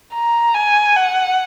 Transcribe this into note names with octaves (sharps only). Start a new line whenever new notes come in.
A#5
G#5
F#5